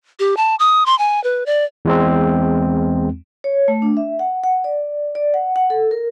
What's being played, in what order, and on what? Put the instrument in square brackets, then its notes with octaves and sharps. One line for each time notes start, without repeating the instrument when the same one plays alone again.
[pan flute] G4
A5
D#6
C6
G#5
B4
D5
[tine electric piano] E2 G#3 C4
[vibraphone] C#5
A3
D4
E5
F#5
F#5
D5
D5
F#5
F#5
A4
A#4